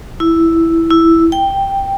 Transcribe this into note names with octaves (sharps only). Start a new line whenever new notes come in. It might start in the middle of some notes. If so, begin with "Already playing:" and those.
E4
E4
G5